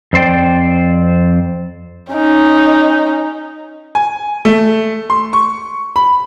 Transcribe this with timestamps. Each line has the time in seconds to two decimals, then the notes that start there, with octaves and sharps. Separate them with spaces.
0.13 F2 C4 C5 D5 G5
2.13 C#4 D#4
3.95 G#5
4.45 A3
5.10 C6
5.33 C#6
5.96 B5